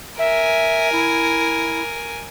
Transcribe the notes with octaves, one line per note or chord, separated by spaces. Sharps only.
A#4 E5 G#5
E4